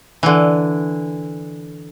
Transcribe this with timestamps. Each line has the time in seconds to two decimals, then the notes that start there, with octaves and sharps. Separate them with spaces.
0.23 D3 E3